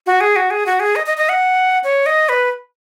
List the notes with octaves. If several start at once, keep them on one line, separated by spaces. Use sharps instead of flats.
F#4
G#4
F#4
G#4
F#4
G#4
D#5
D#5
D#5
F#5
C#5
D#5
B4